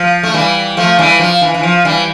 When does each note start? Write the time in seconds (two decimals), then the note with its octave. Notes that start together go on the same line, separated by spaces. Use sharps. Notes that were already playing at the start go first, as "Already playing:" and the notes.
Already playing: F3
0.23 A3
0.34 E3 G3
0.77 F3 A3
0.99 E3 G3
1.20 F3
1.41 E3
1.54 E3
1.63 F3
1.85 E3 G3